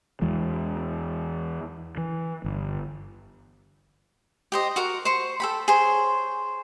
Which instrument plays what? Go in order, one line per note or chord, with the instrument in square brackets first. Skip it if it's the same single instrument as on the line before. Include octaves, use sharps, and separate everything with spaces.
[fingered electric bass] E2 E3 G#3
E3
G1
[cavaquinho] G4 C5 D#5
F#4 A#4 F#5
C5 C#6
A4 G5 B5
G#4 C5 C#5